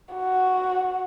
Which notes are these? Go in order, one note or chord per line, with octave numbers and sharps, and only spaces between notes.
F#4